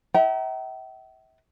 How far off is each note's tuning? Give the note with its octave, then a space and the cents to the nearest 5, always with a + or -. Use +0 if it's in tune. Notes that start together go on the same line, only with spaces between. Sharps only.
E5 -35 G5 -45 A#5 +5